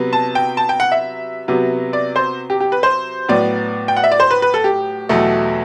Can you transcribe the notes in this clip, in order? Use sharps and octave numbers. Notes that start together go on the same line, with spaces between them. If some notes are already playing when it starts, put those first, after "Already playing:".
Already playing: C3 F#3 B3
A5
G5
A5
G5
F#5
E5
C3 F#3 B3
D5
C5
G4
G4
B4
C5
A2 F#3 B3 D5
G5
F#5
E5
D5
C5
B4
B4
A4
G4
E2 B2 F#3 A3